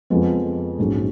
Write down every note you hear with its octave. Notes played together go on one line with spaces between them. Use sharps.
F2 F3 G#3 B3
A#1 G#2 F#3 C#4 G#4